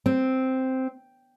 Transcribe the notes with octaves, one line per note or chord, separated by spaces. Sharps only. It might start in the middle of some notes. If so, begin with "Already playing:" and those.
C4